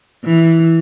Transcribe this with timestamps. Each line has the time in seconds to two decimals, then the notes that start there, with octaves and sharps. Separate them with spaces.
0.25 E3